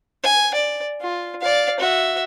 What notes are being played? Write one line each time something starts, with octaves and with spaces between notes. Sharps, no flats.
G#5
D5
F4
D5 F5
F#4 E5